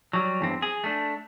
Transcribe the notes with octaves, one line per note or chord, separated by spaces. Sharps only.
F#3 G3
E2 G2 C4
G#4
A3 D4